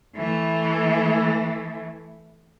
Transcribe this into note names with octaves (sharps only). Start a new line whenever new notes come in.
E3 A3